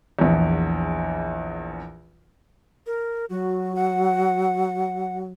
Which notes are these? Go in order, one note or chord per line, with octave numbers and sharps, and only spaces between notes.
A#1 E2
A#4
F#3 F#4
F#5